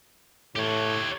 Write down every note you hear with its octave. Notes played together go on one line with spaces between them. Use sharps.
A2 G4 C#5